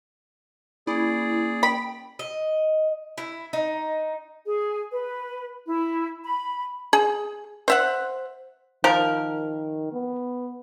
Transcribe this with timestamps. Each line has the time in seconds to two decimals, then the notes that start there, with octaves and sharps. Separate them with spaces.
0.87 A#3 C#4 E4 G#4 D5
1.63 G5 B5
2.19 D#5
3.18 E4
3.53 D#4
4.46 G#4
4.91 B4
5.67 E4
6.24 B5
6.93 G#4
7.68 C5 E5 F#5
8.84 D#3 F3 A#4
9.92 B3